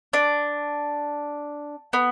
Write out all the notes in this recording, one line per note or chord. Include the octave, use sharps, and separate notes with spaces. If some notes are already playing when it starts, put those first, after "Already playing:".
D4
B3